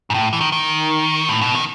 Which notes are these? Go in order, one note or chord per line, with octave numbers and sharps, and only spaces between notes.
G#2
A2
E3
D#3
D#3
A2
B2
D#3